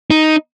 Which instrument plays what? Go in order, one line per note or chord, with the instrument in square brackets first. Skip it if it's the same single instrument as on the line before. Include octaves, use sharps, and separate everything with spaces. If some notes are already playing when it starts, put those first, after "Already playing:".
[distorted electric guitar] D#4